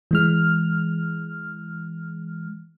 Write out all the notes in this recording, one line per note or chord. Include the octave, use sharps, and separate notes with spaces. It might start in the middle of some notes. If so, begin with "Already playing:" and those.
E3 G#3 F6